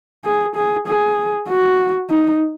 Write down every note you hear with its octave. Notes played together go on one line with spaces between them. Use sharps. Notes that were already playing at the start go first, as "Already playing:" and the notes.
G#4
G#4
G#4
F#4
D#4